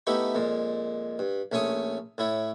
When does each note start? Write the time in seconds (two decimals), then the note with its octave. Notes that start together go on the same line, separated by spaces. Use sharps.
0.07 A3 B3 D#4 E4 G4 C#6
0.35 F2 A#2 G#3
1.19 G2
1.52 A#1 A3 C#4 C#5 C#6 D#6
2.18 A2 E4 C#5